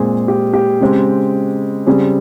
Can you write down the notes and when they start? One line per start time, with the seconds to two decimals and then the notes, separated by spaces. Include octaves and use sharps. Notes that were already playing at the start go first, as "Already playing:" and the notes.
Already playing: A#2 G#3 C4 G#4
0.28 G4
0.54 G4
0.81 C#3 G#3 C4
1.86 C#3 G3 C4 G#4